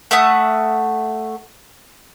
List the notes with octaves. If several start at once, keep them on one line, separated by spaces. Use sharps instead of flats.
A3 E5 F#5 D#6